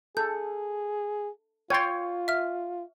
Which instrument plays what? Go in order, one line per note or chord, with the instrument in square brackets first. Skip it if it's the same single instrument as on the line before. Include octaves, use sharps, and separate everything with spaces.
[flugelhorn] G#4 [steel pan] A4 [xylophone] G6
[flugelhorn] F4 [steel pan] C#5 G5 C6 [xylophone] G#6 A6
[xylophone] E5 F6